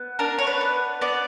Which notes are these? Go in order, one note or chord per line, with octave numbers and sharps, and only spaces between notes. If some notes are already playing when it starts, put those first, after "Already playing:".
Already playing: B3
D4 A#4
C#5
B4
B3
B3 D5